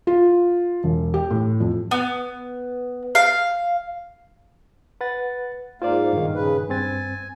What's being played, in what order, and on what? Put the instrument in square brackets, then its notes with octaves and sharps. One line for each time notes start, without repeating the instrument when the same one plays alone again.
[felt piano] F4
E1
G4
A2
F2
[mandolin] B3
F5
[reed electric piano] B4 F#5 A6
[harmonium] G#2 A#3 F5 [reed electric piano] F4 C5 D5
[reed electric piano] G2 A#2 D#3
[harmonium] C#3 B4
[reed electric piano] G2 C4 A6 [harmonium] G#5